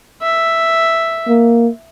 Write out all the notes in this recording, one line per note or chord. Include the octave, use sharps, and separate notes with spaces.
E5
A#3